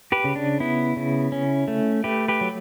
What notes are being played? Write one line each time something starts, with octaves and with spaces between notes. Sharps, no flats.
G4 B4
C#3
D4
B3 E4
C#3
C#4
A3
A3 G4 B4
G4 B4
F#3